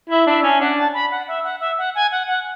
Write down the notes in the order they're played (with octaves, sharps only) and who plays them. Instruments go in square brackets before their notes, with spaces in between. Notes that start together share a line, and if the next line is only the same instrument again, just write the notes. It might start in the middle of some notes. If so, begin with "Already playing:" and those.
[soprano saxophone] E4 [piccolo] E5
[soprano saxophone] D4 [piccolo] E5
[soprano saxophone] C#4
[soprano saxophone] D4 [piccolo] F#5
[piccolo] A5
B5
F#5
E5
F#5
E5
F#5
G#5
F#5
F#5